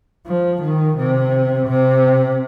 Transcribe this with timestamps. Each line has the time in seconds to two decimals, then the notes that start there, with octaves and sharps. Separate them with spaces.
0.27 F3
0.62 D#3
0.98 C3
1.68 C3